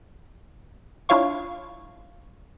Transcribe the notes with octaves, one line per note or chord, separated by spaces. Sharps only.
D4 E4 F4 C#5 F5 C#6